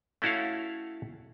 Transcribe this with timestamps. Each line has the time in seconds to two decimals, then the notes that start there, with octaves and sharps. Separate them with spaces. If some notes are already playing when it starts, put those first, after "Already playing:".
0.22 A3 C#4 E4 F#4 C#5 F5